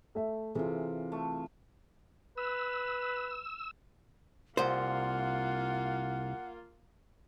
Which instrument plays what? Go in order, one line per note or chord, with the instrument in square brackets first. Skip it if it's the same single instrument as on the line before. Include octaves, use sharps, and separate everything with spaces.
[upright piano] A3 E5
[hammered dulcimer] C3 F4 [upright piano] E3 G#4 A4
[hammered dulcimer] A3
[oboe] B4 [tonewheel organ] E6
[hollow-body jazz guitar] C2 C5 [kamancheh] A#3 F4 [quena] F#5